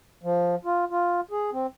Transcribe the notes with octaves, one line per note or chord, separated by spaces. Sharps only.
F3
F4
F4
G#4
C4